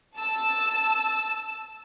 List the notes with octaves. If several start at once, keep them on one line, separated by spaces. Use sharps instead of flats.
A5 E6